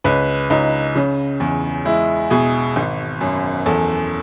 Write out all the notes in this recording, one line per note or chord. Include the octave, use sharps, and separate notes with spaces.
C#2 B4
C#2 D#4
C#3
E2
G#3 E4
B2 G#4
G#1
F#2
E2 A4